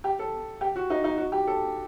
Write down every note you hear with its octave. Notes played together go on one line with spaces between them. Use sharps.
G4
A4
G4
F#4
D#4
D#4
F#4
G4
A4